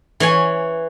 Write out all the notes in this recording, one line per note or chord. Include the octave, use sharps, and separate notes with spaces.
E3 C#5 G#5